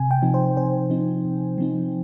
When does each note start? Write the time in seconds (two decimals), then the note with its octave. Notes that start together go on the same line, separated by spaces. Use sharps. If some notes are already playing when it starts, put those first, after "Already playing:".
Already playing: C3 G#5
0.11 G5
0.22 F3 C4 D#4
0.34 C5
0.57 C3 C5
0.90 F3 C4 D#4
1.25 C3
1.58 F3 C4 D#4